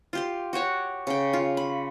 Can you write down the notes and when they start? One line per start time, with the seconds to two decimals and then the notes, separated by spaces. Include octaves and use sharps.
0.13 F4 G4 C6
0.53 F#4 G4 C#5 F#5
1.07 C#3 G5
1.33 F4
1.57 B5